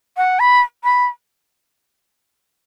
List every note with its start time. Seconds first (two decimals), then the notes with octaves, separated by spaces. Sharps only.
0.17 F#5
0.40 B5
0.84 B5